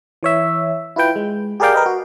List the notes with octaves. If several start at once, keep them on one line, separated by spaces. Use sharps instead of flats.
E3 C#5 E5
E4 F4 B4 G5
G#3
G4 G#4 A#4 D5 F5 G5
A#4 B4 D#5 G5
F#4